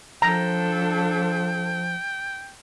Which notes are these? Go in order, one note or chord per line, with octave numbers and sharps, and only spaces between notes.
F3 D4 A4 G5 A#5